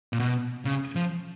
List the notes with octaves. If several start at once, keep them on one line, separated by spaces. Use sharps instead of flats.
A#2
B2
C#3
F3